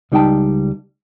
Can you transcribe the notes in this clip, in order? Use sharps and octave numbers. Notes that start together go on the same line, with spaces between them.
C#2 G3 D#4 F5 G5 A5